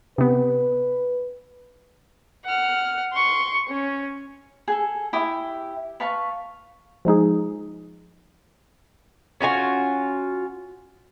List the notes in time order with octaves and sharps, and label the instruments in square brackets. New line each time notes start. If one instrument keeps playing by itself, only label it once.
[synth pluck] C3 B3 [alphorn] B4
[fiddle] F#5 F6
C6 C#6
C#4
[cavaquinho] G#4 A4
E4 G4 D6 D#6
B4 F5 A5 C#6
[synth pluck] F3 G#3 D#4 G#4
[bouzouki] C#4 F4 F#4 G#5